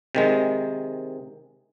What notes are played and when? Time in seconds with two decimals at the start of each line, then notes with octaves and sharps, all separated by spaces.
0.15 C3 D#3 G#3